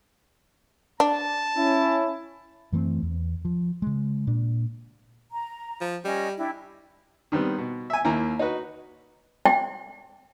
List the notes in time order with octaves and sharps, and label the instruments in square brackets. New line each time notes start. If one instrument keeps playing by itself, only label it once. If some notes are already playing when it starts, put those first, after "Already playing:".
[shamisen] D4 [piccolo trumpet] A5
[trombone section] C#4 E4
[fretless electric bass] F#2 E3 A3 C4
E2
F3
C#3 G#3
A#2 D4
[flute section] A#5
[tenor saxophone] F3
[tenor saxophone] G3 [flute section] C#4 D#5
[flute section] D4 E4 G5
[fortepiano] D#3 G3 B3 C4
B2
E5 G#5
D#2 A#3 E4 A#5
D#4 F#4 B4
[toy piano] G5